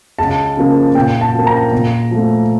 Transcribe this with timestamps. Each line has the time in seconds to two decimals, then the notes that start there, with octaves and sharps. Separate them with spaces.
0.19 C#2 A5
0.57 C#3 F3 A#3
0.95 A#2 G5
1.21 A5
1.34 F3 A#3
1.47 A#5
1.73 A#2
2.11 F3 A3